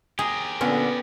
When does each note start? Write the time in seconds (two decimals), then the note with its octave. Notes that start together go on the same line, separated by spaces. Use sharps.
0.19 G4 G#4 A#4
0.61 A#2 D3 B3 C#4